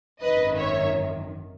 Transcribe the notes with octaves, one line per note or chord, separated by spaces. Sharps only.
G#1 F#2 D#3 B4 D#5
C#5 E5